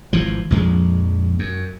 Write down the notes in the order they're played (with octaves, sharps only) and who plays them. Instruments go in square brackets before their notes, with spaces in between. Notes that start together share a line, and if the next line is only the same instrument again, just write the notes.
[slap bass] G#1 E3 F3
A#1 F2 G#3
F#2